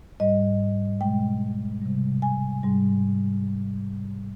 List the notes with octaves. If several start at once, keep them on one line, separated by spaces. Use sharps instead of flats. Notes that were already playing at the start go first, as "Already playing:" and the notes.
G#2 G3 D#5
B2 G#3 G5
C3 G3
G#5
G#2 G3